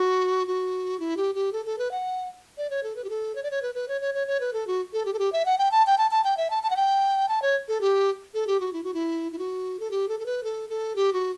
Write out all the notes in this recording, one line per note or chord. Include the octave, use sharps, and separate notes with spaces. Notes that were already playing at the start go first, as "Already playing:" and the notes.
Already playing: F#4
F#4
E4
G4
G4
A4
A4
B4
F#5
D5
C#5
A4
B4
G4
A4
C#5
D5
C#5
B4
B4
C#5
C#5
C#5
C#5
B4
A4
F#4
A4
G4
A4
G4
E5
F#5
G5
A5
G5
A5
A5
G5
E5
A5
A5
F#5
G5
A5
C#5
A4
G4
A4
G4
F#4
E4
F#4
E4
E4
F#4
A4
G4
A4
A4
B4
A4
A4
G4
F#4